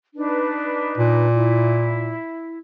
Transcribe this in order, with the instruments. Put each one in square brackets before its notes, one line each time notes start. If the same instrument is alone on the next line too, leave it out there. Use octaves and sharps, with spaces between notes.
[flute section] D4 D#4 B4
[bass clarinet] A#2
[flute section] E4